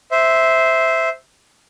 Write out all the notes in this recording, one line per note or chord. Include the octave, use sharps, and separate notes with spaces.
C5 E5